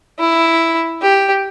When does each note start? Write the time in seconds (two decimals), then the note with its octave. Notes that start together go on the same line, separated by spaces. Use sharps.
0.19 E4
1.01 G4